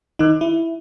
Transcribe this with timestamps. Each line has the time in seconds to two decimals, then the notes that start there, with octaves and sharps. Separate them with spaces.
0.19 D#3 D#4
0.41 E4